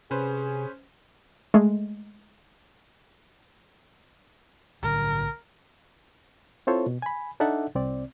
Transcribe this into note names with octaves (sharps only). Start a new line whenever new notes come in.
C3 C#4 G#4 B4 C5
G#3 A3
B1 A2 D3 A#4
C4 E4 F4 A4 C5 C#5
B2
G#5 B5
D4 D#4 A4 D5 E5 F#5
C2 C4 D5